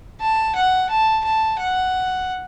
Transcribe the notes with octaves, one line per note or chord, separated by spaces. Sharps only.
A5
F#5
A5
A5
F#5